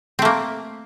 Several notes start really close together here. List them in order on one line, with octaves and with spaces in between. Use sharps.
C4 A3 A#3